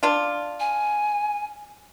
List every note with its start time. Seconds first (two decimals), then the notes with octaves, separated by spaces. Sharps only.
0.03 D4 F4
0.60 G#5